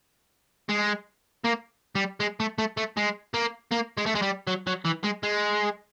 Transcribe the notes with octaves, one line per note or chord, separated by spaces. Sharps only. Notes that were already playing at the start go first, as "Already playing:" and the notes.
G#3
A#3
G3
G#3
A3
A3
A3
G#3
A#3
A#3
G#3
A3
G#3
G3
F#3
F#3
E3
G#3
G#3